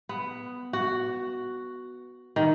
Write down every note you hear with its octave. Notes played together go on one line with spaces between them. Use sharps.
B3
F#4
D#3